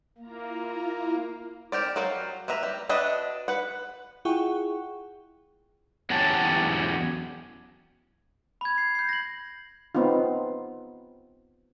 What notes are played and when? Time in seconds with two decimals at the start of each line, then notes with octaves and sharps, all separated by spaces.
0.18 A#3 E4 F4 A#5
1.72 C4 G4 A#4 D5
1.96 F#3 G3 A#4 F5
2.48 A#3 B4 E5 A#5
2.63 G3
2.89 D4 F#4 B4 D#5 E5
3.48 B4 F#5
4.25 E4 F4 G#4 F#5 G5 C#6
6.10 E2 F#3 C#4 G4 A5
8.61 B5 G#6
8.78 C7
8.95 G6 C7
9.09 A#6 F#7
9.95 B3 C4 D#4 F4